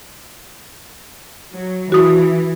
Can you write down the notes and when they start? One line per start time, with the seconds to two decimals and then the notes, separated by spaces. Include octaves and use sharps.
1.53 F#3
1.92 E3 F#4 D#6